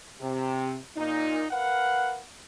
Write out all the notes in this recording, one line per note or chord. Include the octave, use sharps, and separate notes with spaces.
C3
A#2 D#4
A#4 B4 F5 F#5